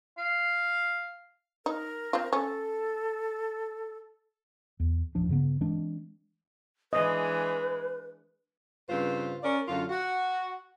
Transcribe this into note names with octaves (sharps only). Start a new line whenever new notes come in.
F5
D#4 A#4
C4 F4
C#4 A4
E2
D1 A1 F3 D4
G2 C#3 B3
E3 G#3 C4 D4
E3 G#3 D4 B4 D#5
G2 C#3 C4 F4 B4 C5
C#4 A#4 D5
F#2 D3 F#3 F4
F#4